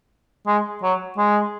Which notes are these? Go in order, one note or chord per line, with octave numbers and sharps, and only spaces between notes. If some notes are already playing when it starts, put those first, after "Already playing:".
G#3
F#3
G#3